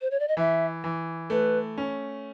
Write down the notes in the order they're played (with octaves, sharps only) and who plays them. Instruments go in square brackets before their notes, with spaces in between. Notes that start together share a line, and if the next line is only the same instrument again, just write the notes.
[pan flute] C5
C#5
D5
D#5
[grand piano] E3 [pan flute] E5
[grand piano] E3
[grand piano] A3 [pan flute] B4
[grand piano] C#4